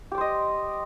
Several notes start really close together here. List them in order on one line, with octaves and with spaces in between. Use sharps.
G4 D5 C5 D#5